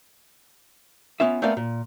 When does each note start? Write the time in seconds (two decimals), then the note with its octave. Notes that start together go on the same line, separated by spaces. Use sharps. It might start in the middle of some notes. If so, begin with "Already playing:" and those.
1.20 B3 C#4 F4 E5
1.42 A3 B3 C4 A#4 D5 F5
1.57 A#2